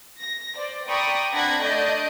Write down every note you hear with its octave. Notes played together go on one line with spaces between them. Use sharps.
A#6
C5 D5
D5 G5 A#5 B5 C#6 D#6
C4 D4 F#5 B5 G#6 A#6
A3 D4 D5 D#5 G6